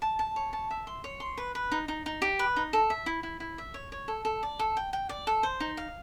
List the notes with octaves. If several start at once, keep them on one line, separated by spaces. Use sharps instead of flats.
A5
A5
C#5
A5
E5
C6
C#5
C6
B4
B4
D#4
D#4
D#4
G4
B4
D#4
A4
E5
E4
E4
E4
E5
C#5
C#5
A4
A4
D5
A4
G5
G5
D5
A4
C5
D#4
F5